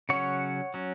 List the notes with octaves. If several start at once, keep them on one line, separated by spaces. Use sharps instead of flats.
C#3 F#3 C#4 C#5 F#5
F#3 C#4